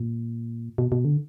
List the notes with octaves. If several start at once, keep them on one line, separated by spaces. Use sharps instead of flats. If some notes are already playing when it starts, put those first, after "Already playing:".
Already playing: A#2
B2
B2
D3